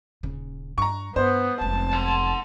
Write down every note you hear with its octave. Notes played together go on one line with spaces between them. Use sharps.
D#1 C#3
G2 A#5 C#6
G2 B3 C5
F1 G#3 A5
F#5 C6